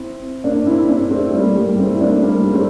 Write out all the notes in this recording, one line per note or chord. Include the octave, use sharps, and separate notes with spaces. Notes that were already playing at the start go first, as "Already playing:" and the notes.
Already playing: C4 E4
A#3 D4
C4 E4
E4
A#3 D4
A3 C4
G3 A#3
G3 A#3
A3 C4
E4
A#3 D4
G3 A#3
A3 C4